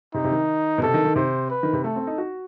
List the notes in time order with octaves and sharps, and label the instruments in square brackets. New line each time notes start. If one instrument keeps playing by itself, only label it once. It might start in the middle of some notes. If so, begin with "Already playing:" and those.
[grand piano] C3 [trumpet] D#4
[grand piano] C3
D#3
B2
[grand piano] C3 [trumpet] A4
[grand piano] D#3
D#3
[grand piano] C3 [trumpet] C5
[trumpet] B4
[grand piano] D#3
C3
[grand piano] A3 [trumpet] A4
[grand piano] C4
D#4
F#4